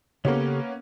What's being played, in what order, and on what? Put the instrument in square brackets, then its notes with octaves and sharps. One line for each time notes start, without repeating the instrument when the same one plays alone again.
[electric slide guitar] C#3 G4 A4 [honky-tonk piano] A#3 B3 C#4